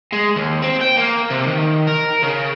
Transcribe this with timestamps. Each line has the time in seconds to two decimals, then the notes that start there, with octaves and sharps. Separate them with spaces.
0.13 G#3
0.36 D#2
0.62 C4
0.81 G5
0.97 A#3
1.30 C3
1.47 D#3
1.87 A#4
2.23 C#3